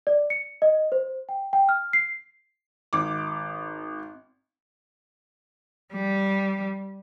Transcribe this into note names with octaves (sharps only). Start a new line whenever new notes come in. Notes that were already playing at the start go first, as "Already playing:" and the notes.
D5
C#7
D#5
C5
G5
G5
F6
C7
G#1 D6
G3